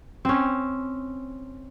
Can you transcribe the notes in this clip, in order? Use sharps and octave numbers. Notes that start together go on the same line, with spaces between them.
C4 C#4